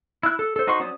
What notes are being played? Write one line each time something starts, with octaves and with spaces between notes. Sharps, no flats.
E4 F#6
A4
A4 C5
D#4 F#4 C5 C6 C#6
F#3 C#4 C5 D5 D#6